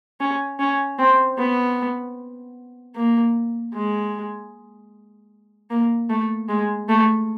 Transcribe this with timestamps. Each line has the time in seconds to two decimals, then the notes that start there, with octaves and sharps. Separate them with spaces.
0.20 C#4
0.59 C#4
0.98 C4
1.37 B3
2.95 A#3
3.74 G#3
5.70 A#3
6.10 A3
6.49 G#3
6.89 A3